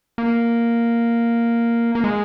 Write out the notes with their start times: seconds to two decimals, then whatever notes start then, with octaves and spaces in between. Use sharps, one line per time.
0.18 A#3
1.95 A#3
2.04 G#3